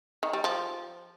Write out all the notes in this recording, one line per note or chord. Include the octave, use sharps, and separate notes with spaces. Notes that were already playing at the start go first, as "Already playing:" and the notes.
D#3
G3
F3